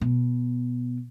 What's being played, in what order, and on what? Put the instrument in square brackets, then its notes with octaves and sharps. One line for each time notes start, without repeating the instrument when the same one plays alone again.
[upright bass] B2